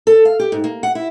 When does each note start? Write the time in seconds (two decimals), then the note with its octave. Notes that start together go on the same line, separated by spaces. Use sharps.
0.07 A4
0.25 F5
0.39 G4
0.52 G#2
0.64 A#3
0.83 F#5
0.95 E4